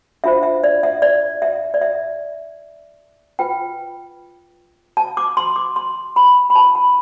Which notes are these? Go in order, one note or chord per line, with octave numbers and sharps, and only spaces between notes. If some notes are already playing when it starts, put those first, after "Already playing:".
D4 F4 C5 E5
E5
D5
E5
D5
E5
D5
E5
F4 B4 G5
A5
D6
C6
D6
C6
B5
B5
E4 B4 A5
B5